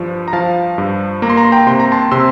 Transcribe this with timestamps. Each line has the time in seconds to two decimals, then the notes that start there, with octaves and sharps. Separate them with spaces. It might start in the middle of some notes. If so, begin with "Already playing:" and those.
Already playing: G2 F3
0.28 A#5
0.33 F3 F5 A5
0.78 G2
1.22 A#3 A#5
1.30 C6
1.37 A#5
1.45 C6
1.52 G5 A#5
1.67 C3 C6
1.80 A#5
1.92 A5 C6
2.11 C3 C6 E6